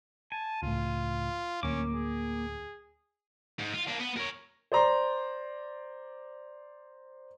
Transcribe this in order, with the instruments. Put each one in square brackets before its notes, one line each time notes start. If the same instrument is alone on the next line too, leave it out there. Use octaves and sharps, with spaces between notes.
[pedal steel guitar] G#5 [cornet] A5
[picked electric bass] C#2 A2 [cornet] F4
[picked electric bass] D1 D2 [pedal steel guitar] A#3 D6 [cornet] C#4
[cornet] G#4
[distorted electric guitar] G#2
F4
A#3 D4
B3
A#4 C#5
[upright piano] C5 D5 A#5 C6